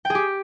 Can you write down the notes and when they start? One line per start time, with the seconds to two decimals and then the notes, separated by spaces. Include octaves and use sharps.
0.05 G5
0.10 G#4
0.15 G4